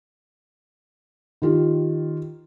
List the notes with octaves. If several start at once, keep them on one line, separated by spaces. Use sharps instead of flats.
D#3 F4 G4